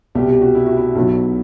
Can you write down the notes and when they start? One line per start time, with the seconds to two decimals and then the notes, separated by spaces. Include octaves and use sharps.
0.15 C2 B2 G3 G4
0.28 G4
0.41 F#4
0.55 E4
0.66 F#4
0.77 E4
0.95 B1 B2 F#3